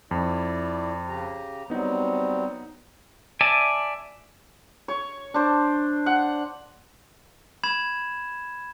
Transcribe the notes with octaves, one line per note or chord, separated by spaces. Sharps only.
F2 E4 D5
C#3 G4 A#5
F#3 G3 B3 C4 D#4
D5 E5 G#5 A5
C#5
D4 C5
F#5
B5 G#6 E7